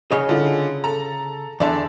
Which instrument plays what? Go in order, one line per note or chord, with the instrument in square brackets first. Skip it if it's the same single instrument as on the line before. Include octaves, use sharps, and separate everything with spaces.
[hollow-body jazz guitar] C#3 C#5 D#5
[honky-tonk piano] D3 F4
A4 A#5
[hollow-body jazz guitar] E2 D3 [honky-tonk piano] D5 E5 A5